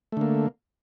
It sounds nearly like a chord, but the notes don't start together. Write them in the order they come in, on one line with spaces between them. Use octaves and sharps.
A3 D3 A#3